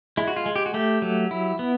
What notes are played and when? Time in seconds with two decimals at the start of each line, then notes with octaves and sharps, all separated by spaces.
0.17 G#3 E4
0.28 F#4
0.36 F4
0.46 G#3
0.56 G4
0.66 F#4
0.74 A3 G4
1.02 F#3
1.31 E4
1.59 B3